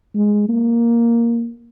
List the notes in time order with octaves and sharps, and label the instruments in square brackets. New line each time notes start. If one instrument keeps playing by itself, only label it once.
[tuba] G#3
A#3